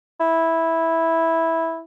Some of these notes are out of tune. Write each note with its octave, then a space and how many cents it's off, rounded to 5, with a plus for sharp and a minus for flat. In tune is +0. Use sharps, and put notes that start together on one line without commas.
E4 -10